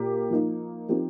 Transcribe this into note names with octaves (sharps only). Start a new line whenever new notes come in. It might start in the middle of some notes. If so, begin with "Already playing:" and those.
Already playing: A#2 A#3 G4 A#4
F3 A#3 D#4
F3 C4 D#4 G4 A#4